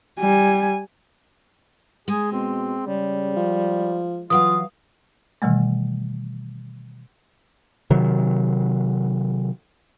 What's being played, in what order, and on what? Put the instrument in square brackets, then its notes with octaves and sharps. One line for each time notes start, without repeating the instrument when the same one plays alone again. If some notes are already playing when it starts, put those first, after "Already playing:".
[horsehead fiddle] G3 G#5
[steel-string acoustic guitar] G#3 [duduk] G#4
[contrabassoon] B2 [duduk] C4
[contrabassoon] C#3 [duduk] G3
[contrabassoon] F3
[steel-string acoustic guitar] E3 F#3 F5 [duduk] F4 [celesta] D#6
[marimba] B2 D#3 E3 G3 A3
[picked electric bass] C3 D#3 F#3